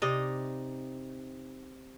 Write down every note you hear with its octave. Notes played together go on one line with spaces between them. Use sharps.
C3 D#4 D5 D#5